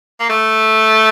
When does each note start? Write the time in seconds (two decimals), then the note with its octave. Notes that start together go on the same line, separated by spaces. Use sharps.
0.20 A#3
0.30 A3